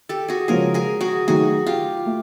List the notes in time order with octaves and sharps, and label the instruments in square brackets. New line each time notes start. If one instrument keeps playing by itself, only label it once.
[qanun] G4 A4
F#4 G#4
[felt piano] C#3 F3 G#3 C#4 F4 [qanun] G#4 A#4
[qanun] G#4 A#4
F#4 G#4
[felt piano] D#3 F#3 A3 [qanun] F#4 G#4
[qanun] F4 G4
[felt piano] A3